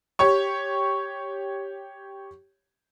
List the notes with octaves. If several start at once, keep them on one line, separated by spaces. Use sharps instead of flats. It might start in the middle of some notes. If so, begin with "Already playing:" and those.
G4 C#5 C#6